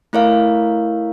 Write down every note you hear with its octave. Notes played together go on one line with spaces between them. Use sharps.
A3 E4 A#4 C#5 F5